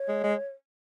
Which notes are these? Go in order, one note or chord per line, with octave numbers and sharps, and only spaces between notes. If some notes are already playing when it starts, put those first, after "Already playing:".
Already playing: C#5
G#3
G#3